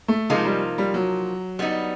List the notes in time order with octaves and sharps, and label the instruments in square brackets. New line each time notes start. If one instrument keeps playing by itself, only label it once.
[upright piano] A3
[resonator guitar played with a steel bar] C3 F3 A#3 D#4 [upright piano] G#3
[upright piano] G3
G3
F#3
[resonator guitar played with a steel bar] G3 B3 D#4